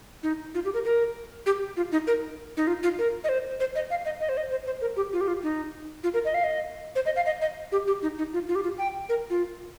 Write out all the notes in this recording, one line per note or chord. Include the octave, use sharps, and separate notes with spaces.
D#4
F4
G4
A#4
A#4
G4
F4
D#4
A#4
D#4
F4
F4
A#4
D#5
C5
C5
D#5
F5
D#5
D#5
C5
D#5
C5
C5
A#4
G4
F4
G4
F4
D#4
F4
A#4
D#5
F5
D#5
C5
D#5
F5
D#5
D#5
G4
G4
D#4
D#4
F4
F4
G4
F4
G5
A#4
F4